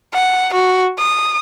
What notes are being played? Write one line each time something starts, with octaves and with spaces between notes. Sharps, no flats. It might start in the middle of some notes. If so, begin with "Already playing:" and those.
F#5
F#4
D#6